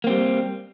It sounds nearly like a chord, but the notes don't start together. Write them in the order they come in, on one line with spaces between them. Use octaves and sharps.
A#3 C4 G3